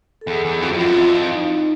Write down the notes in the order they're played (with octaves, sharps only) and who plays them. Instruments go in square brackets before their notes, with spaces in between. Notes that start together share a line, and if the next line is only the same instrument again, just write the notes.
[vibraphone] A4
[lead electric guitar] E2 [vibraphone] G#4
[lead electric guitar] E2
[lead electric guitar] F2 [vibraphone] F#4
[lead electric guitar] F2 [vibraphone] F4
[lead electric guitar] F#2
[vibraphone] F4
[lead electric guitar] F2 [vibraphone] E4
[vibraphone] D#4